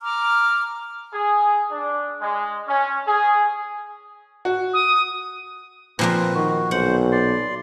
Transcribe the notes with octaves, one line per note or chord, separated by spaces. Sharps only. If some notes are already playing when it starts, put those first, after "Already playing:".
A#5 D6 F6
G#4
D4
G#3
C#4
G#4
F#4
D#6
A#2 F3 A#3 C4 B4
D#3 F#4
B1 C5 F#5
D5 C6